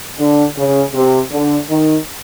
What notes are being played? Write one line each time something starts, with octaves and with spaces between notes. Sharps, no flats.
D3
C#3
C3
D3
D#3